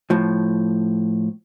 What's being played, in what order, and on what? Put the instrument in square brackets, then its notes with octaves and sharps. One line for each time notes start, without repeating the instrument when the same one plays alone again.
[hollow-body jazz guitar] A2 F3